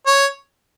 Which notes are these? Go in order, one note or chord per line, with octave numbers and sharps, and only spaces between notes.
C#5